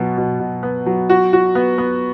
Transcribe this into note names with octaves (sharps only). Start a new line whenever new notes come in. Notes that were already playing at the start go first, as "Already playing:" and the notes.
Already playing: B2 F#3 B3
B2
B2
B3
F#3
F#4
F#4
B3
B3